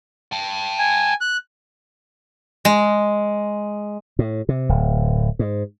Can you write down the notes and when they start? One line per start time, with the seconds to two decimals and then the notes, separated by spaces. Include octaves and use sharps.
0.32 G5 A5
0.79 G#5
1.21 F#6
2.65 G#3
4.19 A2
4.49 C3
4.69 D1
5.39 G#2